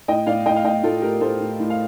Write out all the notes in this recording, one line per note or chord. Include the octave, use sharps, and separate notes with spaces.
A2 D#5 G5
A2 D5 F5
A2 D#5 G5
F5
A2 D#5 G5
A2 F4 A4
A2 G4 A#4
A2 A4 C5
A2
A2
F5